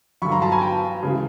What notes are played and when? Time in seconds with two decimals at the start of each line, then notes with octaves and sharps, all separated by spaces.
0.22 G2 D3 F#3 B5 C#6
0.32 A#5 C6
0.42 A5 B5
0.52 G#5 A#5
0.61 G5 A5
1.02 D2 C#3 E3 G#3